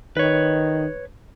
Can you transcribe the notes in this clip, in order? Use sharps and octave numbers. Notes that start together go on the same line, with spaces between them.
D#3 B4 C#5